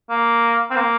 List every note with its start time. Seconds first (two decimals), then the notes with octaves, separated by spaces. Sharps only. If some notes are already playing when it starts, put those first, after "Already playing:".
0.10 A#3
0.70 C4
0.76 A#3